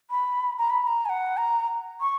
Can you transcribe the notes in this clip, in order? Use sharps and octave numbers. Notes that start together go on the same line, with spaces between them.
B5
A#5
B5
B5
A#5
G#5
F#5
A#5
C#6